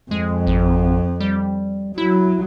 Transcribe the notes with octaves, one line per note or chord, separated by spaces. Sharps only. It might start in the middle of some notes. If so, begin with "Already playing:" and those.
F2 G#3
G#1
G3
F#3 E4